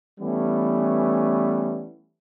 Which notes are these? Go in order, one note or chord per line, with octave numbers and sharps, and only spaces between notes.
E3 G3 A3 B3 C#4